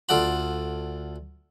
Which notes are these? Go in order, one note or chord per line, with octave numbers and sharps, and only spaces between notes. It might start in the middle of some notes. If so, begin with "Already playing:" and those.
D2 F4 A4 D5 F#5 B5